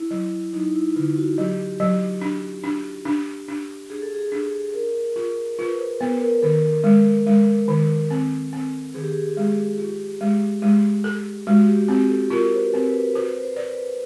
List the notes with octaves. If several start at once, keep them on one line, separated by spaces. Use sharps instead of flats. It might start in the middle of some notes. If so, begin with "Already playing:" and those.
Already playing: E4
F#3
F#3 D#4
E4
D3 F4
F#4
F#3 G4
F#3
D4
D4
D4
D4
D4 G#4
A4
G#4
D4
D4 A#4
F4
F4 B4
C5
B3 B4
A#4
A#4
D#3 A4
G#3
G#3
D#3
C4
C4
D#3 G#4
G4
G#4
G#3
F4 G4
G#3
G#3
A4
G#3 F#4
G4
C4 G4
A4
F4 A#4
C5
B4
C4
B4
A#4
B4
F#4 C5
B4
C5
C5 D5
B4